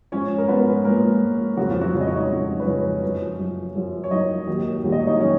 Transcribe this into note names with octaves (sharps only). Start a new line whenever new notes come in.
G#2 F3 C#4 C#5
A#4
G#2 F3 B3 B4
G#2 F3 A#3 A#4
G#2 F3
F2 C#3 F3 F#3 F#4
F3 F4
F#3 F#4
F2 C#3 F3
D#5
C#5
D#4 D#5
F2 C#3 F3
B4
F2 C#3 F3 C#4 C#5
F#2 F3
F#2 F3
F#2 F3
C#5
F#2 F3 D#4 D#5
D#2 D#3 F#3
D#2 D#3 F#3
D#5
C#5
D#4 D#5
D#3 F#3 C#4 C#5